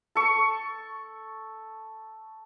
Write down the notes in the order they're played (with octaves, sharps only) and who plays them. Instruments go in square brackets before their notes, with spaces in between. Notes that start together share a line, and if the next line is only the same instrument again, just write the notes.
[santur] A4 C#6